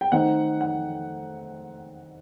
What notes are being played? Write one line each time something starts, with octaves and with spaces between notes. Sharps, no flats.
G5
D#3 A3 C4 D#4 F#5
F#5